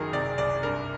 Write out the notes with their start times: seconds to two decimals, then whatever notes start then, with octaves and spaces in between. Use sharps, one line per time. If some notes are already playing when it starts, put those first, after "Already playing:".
Already playing: F#1 D#3 F#3 G#4 A#4
0.13 C3 D5
0.38 C2 D5
0.63 G2 A#4